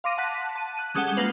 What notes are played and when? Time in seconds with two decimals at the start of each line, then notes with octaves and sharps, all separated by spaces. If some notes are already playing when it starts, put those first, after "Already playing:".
0.04 F5 C6 D6 A#6 D#7
0.18 F#5 A5 F#6 B6
0.55 A5 D#7
0.77 F#6 D#7
0.95 G3 G#3 C#4 A4 F#5 G7
1.17 A#3 F4 B4